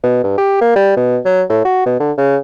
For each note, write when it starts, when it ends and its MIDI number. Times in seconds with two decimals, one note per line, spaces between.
0.04 0.20 47
0.24 0.36 43
0.38 0.60 67
0.61 0.73 58
0.76 0.93 55
0.96 1.18 47
1.25 1.42 54
1.49 1.63 45
1.65 1.85 66
1.86 1.95 47
2.00 2.12 50
2.17 2.37 49